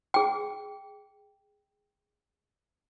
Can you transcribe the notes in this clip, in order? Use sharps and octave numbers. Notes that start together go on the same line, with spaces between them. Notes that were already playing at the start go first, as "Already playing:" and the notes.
G#4 G5